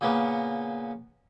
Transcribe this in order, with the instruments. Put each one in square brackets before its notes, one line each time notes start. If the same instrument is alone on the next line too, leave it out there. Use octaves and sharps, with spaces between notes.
[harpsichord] A#2 C#3 A#3 B3